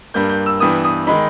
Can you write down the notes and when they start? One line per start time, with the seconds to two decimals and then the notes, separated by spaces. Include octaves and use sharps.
0.14 G2 G3 A#3 G6
0.30 G6
0.46 E6
0.60 G2 E3 G3 B3 D#6
0.84 D#6
1.07 D#3 G#3 D#4 B5